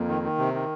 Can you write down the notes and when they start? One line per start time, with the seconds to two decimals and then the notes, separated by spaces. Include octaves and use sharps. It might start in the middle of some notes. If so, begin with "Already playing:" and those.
Already playing: F2 A#3
0.08 D#3
0.23 D#3
0.38 C3
0.54 D#3